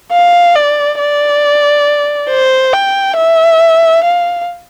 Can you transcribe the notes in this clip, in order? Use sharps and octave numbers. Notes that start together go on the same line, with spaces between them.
F5
D5
D5
C5
G5
E5
F5